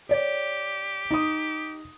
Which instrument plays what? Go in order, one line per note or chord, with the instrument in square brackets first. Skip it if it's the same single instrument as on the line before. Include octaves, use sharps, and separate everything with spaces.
[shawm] G4 [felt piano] C#5 D5
[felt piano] D#4 D#6